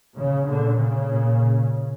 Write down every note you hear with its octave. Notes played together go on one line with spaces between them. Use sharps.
C#3
A#2 D3
C#3
A#2